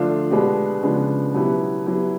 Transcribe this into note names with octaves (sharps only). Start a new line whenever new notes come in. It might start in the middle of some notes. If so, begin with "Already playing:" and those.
Already playing: D3 F3 A3 D4 F4
B2 G#3 B3 D4 G4
C#3 F3 G#3 B3 D4
B2 F#3 B3 E4 G4
F#3 B3 E4 G4